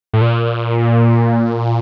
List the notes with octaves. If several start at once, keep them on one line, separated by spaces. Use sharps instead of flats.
A2
A#2